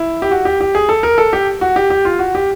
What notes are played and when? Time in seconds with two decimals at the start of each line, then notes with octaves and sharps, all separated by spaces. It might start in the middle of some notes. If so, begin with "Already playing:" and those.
Already playing: E4
0.22 G4
0.31 F#4
0.45 G4
0.61 G4
0.75 G#4
0.89 A4
1.03 A#4
1.18 A4
1.33 G4
1.61 F#4
1.76 G4
1.90 G4
2.05 F4
2.19 F#4
2.35 G4